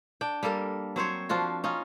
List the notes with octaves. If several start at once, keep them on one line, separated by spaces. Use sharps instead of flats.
D4 G5
G3 A#3 A4 A#4
F#3 C4 C5 C#5
F3 D4 F4 F#4
C#4 D#4 F4